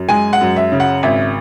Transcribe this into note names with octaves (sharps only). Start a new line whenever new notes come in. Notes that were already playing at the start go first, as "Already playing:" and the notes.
Already playing: F#2
G#3 G#5
F#5
F#2
E5
C#3
F#5
G#1 E5